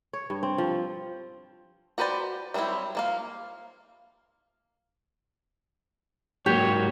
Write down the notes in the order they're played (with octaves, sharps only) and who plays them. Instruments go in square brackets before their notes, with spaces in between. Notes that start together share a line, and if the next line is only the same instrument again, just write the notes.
[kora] C#5
G2
C4
F3
[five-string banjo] F#4 G4 B4 C5 D5
F#3 G3 B3 C4 E4
F3 A#3 F5
[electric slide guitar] G#2 F#3 A#3 [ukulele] G4 [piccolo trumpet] C#5